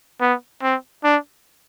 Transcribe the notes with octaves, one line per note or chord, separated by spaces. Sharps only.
B3
C4
D4